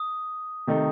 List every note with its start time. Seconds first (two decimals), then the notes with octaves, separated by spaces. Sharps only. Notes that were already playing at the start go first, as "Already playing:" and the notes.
Already playing: D#6
0.67 C3 D#3 A3 D#4